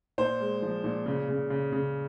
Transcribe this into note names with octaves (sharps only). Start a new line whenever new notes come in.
A#2 C5
G#3
F3
A#2
C#3
C#3
C#3
C#3